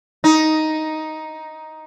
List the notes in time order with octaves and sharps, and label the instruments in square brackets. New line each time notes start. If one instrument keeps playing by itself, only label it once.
[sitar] D#4